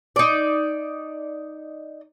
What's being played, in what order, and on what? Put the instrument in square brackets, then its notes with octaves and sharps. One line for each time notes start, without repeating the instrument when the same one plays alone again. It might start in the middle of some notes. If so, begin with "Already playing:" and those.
[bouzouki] D#4 D5